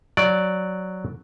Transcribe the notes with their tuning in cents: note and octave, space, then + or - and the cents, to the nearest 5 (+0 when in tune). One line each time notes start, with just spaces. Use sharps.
F#3 +0 D5 +0